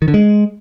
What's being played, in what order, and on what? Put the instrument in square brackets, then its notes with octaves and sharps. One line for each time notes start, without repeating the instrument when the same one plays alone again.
[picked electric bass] D#3
D3
G#3